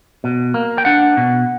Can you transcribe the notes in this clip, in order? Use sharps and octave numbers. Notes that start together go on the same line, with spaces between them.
B2
A#3
G5
D4 F#5
B2